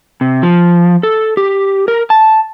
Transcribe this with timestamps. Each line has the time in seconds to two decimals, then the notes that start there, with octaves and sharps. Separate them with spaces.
0.21 C3
0.43 F3
1.03 A4
1.37 G4
1.88 A#4
2.10 A5